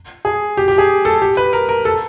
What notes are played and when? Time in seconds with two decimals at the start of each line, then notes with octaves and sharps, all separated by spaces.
0.25 G#4
0.57 G4
0.68 G4
0.78 G#4
1.05 A4
1.22 G4
1.37 B4
1.53 A#4
1.69 A#4
1.85 A4